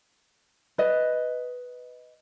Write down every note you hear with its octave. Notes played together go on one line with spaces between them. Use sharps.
B4 D#5